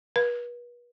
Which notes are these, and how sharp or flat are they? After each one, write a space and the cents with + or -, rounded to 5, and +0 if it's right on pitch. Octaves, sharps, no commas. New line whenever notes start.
B4 -40